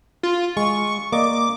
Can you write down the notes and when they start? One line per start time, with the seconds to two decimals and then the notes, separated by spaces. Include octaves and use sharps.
0.23 F4
0.57 G#3 C#6
1.12 A#3 D5 D#5 D6